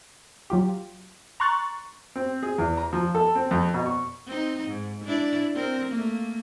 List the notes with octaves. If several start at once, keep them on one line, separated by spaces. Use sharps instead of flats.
F#3 F4 G4
A#5 C6 C#6 F#6 A6
C4
G#4
E2
A#5
F3
A4
C4
F2
B2
C#6
C4 D#4
G#2
D4 E4 D5
C4 A#4
A3 A#3